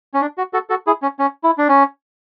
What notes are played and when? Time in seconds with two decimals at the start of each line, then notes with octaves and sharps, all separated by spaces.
0.14 C#4
0.21 D4
0.38 F#4
0.53 F#4 A4
0.70 F#4 A4
0.87 E4 G#4
1.02 C#4
1.19 C#4
1.44 E4
1.58 D4
1.69 C#4